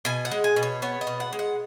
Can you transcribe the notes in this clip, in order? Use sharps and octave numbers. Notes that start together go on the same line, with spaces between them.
B2 G#5
F#5
G#3
G#5
B2
C#5
B3 C#5
D#5
B2
F#5
G#3
F#5